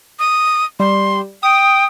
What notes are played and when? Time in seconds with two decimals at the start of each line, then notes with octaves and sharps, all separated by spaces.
0.19 D#6
0.80 G3 C6
1.43 G5 D#6